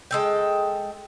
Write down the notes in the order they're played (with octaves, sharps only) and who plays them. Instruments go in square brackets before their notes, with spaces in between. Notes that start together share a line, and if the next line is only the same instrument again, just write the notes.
[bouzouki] G#3 A4 G5